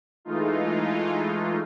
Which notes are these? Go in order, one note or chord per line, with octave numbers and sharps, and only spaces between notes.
E3 G#3 A3 D#4 F4